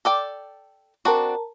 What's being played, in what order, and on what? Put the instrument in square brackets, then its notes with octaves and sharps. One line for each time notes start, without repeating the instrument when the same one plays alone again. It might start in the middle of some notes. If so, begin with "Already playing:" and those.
[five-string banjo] A4 D5 G5
[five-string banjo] C4 D4 F#4 [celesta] A#4 A5 A#5